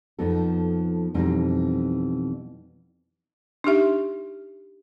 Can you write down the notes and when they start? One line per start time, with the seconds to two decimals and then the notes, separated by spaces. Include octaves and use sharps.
0.19 F2 F3 B3 D#4 A4
1.14 F2 B2 E3 G3 C4 D#4
3.64 D4 D#4 G4 E5